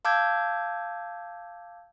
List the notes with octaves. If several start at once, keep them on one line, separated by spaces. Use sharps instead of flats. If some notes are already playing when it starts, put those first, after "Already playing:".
F5 A5 D6 E6 G6 G#6